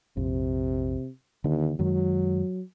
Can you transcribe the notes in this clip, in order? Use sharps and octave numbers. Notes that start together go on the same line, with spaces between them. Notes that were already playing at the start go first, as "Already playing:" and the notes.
A#1 F2 C3
D#2 D3
F#2 D#3 F#3 G#3